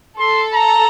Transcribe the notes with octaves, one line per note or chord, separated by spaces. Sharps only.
A4 C6
A#5